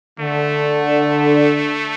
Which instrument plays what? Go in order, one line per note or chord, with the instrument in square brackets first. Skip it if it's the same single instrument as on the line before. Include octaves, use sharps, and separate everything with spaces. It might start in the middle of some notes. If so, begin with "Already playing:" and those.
[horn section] D3 [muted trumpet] A3